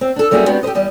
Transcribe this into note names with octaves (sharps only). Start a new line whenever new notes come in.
C4
D4 A4
F#2 G3 A#3 F#4 G#4 E5
G#3 B3 C4 D4 F#4 G4
G4 A4 A#4 C5 D#5
E2 G3 D#5